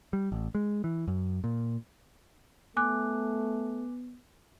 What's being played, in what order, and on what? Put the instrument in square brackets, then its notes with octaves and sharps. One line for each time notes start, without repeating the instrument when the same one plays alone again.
[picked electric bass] G3
A1
G#3
E3
F#2
A#2
[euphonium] A3 [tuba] B3 [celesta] G#5 D6 F#6